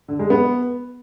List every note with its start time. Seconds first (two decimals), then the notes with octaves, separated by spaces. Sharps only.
0.08 D3
0.19 G#3
0.30 B3